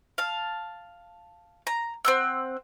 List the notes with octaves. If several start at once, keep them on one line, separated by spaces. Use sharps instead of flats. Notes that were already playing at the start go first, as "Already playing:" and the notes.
F5 A5
A#5
C4 F#5 E6